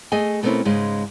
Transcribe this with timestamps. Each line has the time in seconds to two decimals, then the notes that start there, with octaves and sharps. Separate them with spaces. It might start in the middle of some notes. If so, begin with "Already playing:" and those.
0.12 A3 G#4 D#5 G#5
0.43 B2 A3 A#3 C4 C#4 E4
0.65 G#2 C#3 G#3